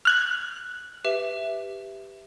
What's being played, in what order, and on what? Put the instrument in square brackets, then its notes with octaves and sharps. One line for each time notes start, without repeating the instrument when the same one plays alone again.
[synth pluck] F6 F#6 G#6
[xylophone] G4 B4 E5